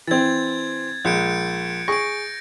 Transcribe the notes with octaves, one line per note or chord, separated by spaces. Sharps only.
E3 C4 G#6 A6
A#1 G#3 G6 C#7 D7
G#4 C#6 A#6 D7